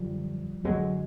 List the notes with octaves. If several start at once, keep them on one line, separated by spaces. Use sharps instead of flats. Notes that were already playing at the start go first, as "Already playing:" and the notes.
Already playing: F#2 D3 F3 G3
F#2 D3 F#3 G#3